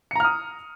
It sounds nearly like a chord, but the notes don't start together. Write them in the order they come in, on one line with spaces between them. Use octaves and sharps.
C#7 A#5 F6 D#6